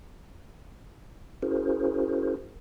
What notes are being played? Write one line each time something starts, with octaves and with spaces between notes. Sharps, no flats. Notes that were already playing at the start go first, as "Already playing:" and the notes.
C#4 E4 F#4 G#4 A#4 C5